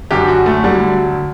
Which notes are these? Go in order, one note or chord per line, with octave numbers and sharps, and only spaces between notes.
F#2 D3 F#3 G4
F#4
A3
D2 D3 F#3 G3